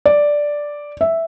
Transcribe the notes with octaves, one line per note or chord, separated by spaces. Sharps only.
D5
E5